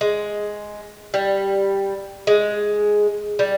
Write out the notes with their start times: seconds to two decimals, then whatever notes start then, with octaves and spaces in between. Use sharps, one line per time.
0.01 G#3
1.14 G3
2.27 G#3
3.39 G3